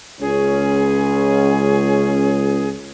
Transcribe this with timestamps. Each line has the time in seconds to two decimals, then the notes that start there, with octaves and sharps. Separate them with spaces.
0.21 C#2 C#4 G#4